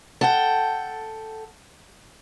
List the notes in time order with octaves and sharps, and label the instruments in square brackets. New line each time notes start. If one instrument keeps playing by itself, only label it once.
[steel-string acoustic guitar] A4 F#5 G5